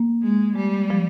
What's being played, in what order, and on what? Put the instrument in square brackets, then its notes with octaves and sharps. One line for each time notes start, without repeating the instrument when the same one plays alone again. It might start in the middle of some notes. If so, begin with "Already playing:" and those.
Already playing: [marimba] A#3
[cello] G#3
[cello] G3 [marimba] G#3
[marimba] F3